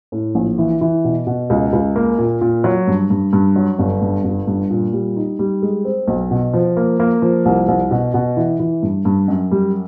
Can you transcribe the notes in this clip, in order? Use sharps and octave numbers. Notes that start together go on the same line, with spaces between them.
A2
A#1
E3
E3
B2
B2
C#2
C#2
A#3
A#2
A#2
F#3
G2
G2
G2
F#3
G1
G2
G1
G2
A#2
G3
D#4
G3
G#3
C4
B1
B2
F3
A#3
A#3
F3
C2
C2
B2
B2
E3
E3
G2
G2
F#2
G3